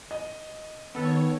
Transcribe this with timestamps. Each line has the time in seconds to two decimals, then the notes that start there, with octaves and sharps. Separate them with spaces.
0.11 D#5
0.95 D#3 B3 A4 C#5